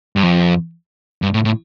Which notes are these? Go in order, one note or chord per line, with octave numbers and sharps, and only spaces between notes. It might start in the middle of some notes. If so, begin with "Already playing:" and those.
G2
F2
G2
A2
A2